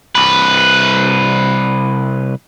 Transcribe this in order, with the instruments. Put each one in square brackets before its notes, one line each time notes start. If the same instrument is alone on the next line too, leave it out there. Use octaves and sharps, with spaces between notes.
[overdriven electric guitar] C2 B4